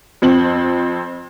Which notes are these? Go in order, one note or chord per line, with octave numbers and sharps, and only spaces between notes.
F2 C4 F#7